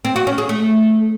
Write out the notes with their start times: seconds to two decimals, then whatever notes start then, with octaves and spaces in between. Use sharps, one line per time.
0.05 C4
0.16 F#4
0.27 C#4
0.38 G#4
0.49 A3